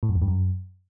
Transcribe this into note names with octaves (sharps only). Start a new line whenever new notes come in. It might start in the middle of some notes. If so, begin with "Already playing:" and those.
A2
F#2
E2
G2
F#2